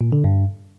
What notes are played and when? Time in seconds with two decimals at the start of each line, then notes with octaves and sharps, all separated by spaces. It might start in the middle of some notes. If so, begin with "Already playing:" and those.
0.01 A#2
0.12 D3
0.24 G2